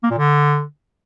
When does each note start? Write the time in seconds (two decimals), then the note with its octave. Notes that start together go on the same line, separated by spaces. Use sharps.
0.03 A#3
0.10 A#2
0.18 D3